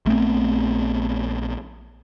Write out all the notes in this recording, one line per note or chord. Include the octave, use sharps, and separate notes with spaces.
A#1 A3 B3 C4